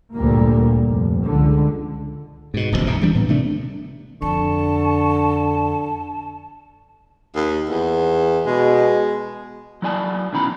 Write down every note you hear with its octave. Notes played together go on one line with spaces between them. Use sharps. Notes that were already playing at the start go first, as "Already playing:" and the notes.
D2 G2 A#2 G3 A#3
F1
C#2 D3
G#2 B2
D1 A#1 G#2 C3
D#1 D#2 C3
E3 G3 A#3 D4
A2 B3
C3 D#3 A3 D4
F2 D3 A5 C#6
D#2
E2
B2 G#3
F#3 E4 D5 G#5 A5
B2 D#3 C#4 E4 A#5 B5